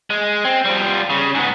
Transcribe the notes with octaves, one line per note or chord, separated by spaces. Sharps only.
G#3
C4
G3 F4
C#3
G#2 B3